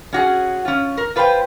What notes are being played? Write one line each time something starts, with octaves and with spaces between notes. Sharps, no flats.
C#4 F#4 G#4
C#4 F4
A#4
F4 B4 C5 F#5 G5